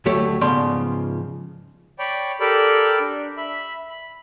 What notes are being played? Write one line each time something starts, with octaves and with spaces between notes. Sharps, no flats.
D2 F#3 A3 G4 C#5
G#2 C#3 F3 B3 D5 C6
C#5 D5 G5 B5
G4 A4 A#4 D5 B5
D4
E5 B5
B5